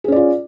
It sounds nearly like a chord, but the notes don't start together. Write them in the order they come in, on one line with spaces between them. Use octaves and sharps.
G#4 C#4 D5 F4